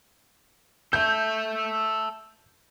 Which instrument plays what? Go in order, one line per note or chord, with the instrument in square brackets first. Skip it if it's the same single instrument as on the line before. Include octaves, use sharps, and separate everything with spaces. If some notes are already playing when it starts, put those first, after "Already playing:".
[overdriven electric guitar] A4 E5 [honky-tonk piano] G6